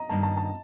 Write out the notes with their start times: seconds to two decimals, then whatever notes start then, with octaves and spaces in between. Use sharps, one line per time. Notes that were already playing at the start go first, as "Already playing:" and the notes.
Already playing: D#5 A#5
0.09 G2 D#3 A#3 A5
0.23 A5
0.37 A5